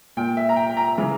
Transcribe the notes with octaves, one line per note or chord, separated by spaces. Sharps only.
A#2 G5
E5
A#5
G5
G5
A#5
C#3 E3